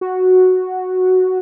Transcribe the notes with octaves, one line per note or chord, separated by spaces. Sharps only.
F#4